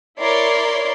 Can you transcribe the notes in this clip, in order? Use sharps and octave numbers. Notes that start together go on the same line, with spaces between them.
E4 A#4 C#5 D5 C6